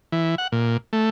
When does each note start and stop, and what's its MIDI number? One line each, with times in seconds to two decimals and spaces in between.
0.12 0.35 52
0.38 0.47 78
0.52 0.77 46
0.93 1.10 57